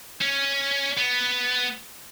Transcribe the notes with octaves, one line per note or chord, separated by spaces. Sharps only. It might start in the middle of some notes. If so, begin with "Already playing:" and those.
C#4
B3